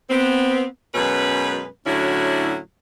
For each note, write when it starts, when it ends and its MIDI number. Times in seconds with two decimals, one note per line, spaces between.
0.10 0.64 59
0.10 0.64 60
0.94 1.66 42
0.94 1.66 47
0.94 1.66 56
0.94 1.66 61
0.94 1.66 71
1.86 2.57 45
1.86 2.57 50
1.86 2.57 54
1.86 2.57 61
1.86 2.57 64
1.86 2.57 66